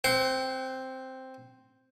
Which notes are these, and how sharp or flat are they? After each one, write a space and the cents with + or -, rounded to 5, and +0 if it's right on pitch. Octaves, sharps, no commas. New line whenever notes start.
C4 +0 F#5 +40